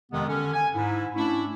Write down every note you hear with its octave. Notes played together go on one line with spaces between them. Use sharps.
F2 C3 D#3 G#3 B3
D3 C#4
G#5
G#2 E4
A3 C#4 D4 E4